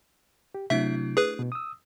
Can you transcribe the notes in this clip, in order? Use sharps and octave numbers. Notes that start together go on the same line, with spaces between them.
G4
C3 F#3 A3 D4 E4 E5
G#4 B4
B2
D#6 E6